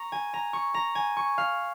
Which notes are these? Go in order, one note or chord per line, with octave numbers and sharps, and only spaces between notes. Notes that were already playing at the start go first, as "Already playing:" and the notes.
Already playing: A#5 C#6
G#5
A#5
C#6
A#5
G#5
C#6
F5